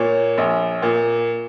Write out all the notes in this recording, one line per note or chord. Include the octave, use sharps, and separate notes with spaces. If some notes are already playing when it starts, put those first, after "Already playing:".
Already playing: A#2 C#5
A#1
A#2